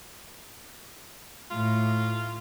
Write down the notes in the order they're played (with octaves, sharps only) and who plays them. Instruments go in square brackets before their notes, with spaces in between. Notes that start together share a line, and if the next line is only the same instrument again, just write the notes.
[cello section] A2 [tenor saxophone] F4